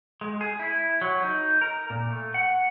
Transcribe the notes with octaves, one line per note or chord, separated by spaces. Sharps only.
G#3
G#4
E4
F#3
D#4
A#4
A#2
A3
F#5